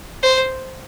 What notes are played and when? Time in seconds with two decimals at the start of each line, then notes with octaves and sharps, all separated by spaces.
0.23 C5